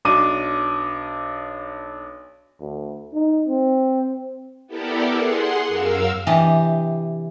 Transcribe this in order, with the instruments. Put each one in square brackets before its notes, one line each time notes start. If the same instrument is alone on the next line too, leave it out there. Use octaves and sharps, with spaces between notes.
[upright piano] B1 D4 D6 D#7
[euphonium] D2
D#4
C4
[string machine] B3 E4 G4 A4 A#4 D5
G#4 F#5 C6
F#2 A#4 F5 E6
[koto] C3 E3 D4 G4 D#5